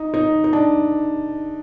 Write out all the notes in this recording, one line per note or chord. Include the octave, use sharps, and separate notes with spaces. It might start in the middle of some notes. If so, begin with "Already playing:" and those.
Already playing: D#4
D#4
D#4
D4